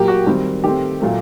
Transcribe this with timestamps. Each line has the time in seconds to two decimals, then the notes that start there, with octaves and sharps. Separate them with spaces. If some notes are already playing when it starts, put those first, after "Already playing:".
Already playing: A#2 F#3 A#3 G4
0.08 F#4
0.27 D#3 G3 C4
0.64 D#3 A3 C4 G4
1.01 A#2 F#3 A3